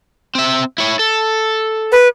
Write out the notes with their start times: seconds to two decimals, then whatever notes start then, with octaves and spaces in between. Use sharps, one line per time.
0.35 C4 E5
0.78 E4 C#5
0.99 A4
1.92 B4